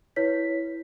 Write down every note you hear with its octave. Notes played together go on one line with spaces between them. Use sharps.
E4 B4 C#5 B6